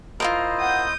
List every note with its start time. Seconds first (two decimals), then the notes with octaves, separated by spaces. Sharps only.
0.20 E4 F4 A4 A#4 C5 D#5
0.60 F#5 D#6 G6